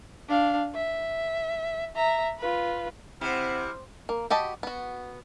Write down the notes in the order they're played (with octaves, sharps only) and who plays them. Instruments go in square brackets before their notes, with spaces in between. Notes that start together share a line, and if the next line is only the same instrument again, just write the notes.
[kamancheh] D4 F5
E5
E5 A#5
F4 B4
[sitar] C3 [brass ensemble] C4 F#5 [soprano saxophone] E4 [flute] F6
[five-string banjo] A#3
F#4 G4 D#5 A5 B5
B3 F#4